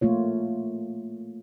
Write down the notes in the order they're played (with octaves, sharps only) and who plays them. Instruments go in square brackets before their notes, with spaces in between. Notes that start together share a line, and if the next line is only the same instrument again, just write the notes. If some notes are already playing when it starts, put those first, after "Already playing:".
[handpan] A3 A#3 F4 C#5